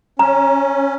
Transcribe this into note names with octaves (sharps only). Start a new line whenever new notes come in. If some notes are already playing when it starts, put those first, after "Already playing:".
C#4 A#5